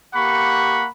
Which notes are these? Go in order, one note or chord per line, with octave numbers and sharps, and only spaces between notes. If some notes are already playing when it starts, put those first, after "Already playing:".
A#3 G4 F#5 B5 C#6